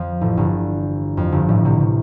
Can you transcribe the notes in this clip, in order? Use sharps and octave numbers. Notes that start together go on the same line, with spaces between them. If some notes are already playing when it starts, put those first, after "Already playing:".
Already playing: F2 F3
A1 A2
G1 G2
F2
G1 G2
A1 A2
C2 C3
C3